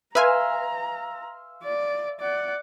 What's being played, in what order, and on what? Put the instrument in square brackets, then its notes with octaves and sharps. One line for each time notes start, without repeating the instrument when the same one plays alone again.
[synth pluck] B4 G#5 [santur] E5 F5 C6 [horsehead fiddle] A#5
[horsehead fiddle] D5
D5 F#5